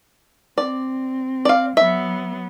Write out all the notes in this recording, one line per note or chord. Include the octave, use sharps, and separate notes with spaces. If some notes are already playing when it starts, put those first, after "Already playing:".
C4 D5
D5 F5
F#3 B3 E5